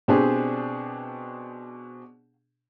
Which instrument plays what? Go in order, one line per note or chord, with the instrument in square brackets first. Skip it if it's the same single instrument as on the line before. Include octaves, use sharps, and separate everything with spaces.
[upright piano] B2 C4 D4 G4 G#4